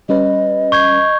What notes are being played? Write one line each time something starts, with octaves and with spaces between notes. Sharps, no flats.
G3 C#4 B4 D#5
C#6 G6 G#6